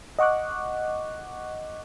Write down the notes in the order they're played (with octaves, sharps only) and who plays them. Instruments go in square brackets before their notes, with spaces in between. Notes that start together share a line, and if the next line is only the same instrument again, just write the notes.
[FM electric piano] D#5 F#5 C#6 D6 F#6